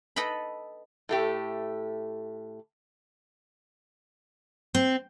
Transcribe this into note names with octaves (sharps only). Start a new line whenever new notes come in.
A4 B4 D#5 G5 B5
A2 A3 G4
C4